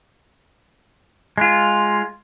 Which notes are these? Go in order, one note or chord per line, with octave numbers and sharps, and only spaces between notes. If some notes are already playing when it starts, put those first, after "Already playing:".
G#3 F4